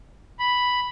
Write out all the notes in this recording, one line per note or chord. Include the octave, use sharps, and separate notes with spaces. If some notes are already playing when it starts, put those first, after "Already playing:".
B5